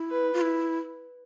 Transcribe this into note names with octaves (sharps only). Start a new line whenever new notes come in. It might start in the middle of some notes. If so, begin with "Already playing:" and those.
Already playing: E4
B4
F4
E4